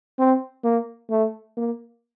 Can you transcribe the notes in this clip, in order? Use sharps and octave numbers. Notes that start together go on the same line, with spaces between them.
C4
A#3
A3
A#3